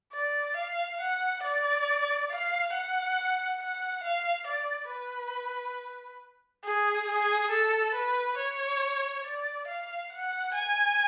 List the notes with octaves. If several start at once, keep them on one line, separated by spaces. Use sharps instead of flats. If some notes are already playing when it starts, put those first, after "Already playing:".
D5
F5
F#5
D5
F5
F#5
F#5
F5
D5
B4
G#4
G#4
A4
B4
C#5
D5
F5
F#5
G#5